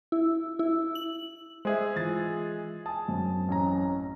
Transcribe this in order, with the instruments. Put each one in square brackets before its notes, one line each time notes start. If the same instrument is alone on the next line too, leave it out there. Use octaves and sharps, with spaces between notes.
[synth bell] E4
E4
F#7
[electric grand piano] G#3 G#4 E5 [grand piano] C5
[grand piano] E3 F4 A6
[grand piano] G#5 D#6 [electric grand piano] A5
[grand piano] F#2 C4
[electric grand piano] A1 C#4 A#5